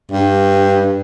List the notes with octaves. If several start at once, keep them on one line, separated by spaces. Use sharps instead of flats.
G2